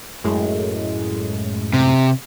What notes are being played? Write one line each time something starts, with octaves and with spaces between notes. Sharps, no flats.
F#2 A2 G#3
C3